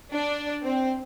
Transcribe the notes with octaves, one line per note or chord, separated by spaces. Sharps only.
D4
C4